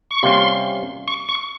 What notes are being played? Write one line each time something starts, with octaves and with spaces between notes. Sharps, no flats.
C#6
C3 G3 A#3 C#4 F4 C6
C#6
C#6